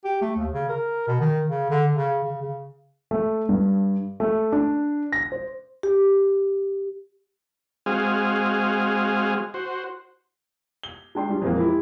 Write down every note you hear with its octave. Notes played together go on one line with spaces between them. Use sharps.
G4
A3
D#2
C#3
A#4
B2
D#3
C#3
D3
C#3
C#3
C#3
A3
G2
A3
D4
A#6
C5
G4
G#3 C4 F#4 G#4 F5
F#4 C5
G7
G#3 D4 G5 C6
G3 D4 G4
F2 A#2 E3 G#3 A#3 C4
E4 G4